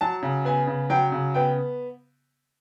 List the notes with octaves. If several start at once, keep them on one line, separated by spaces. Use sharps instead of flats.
F#3 A5
C#3
B3 G#5
C#3
F#3 G5
C#3
B3 G5